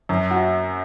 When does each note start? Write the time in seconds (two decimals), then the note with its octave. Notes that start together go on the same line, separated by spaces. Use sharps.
0.09 F#2
0.31 F#4